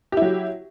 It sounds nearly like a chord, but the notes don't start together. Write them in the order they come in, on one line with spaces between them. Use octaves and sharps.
G4 E4 F#3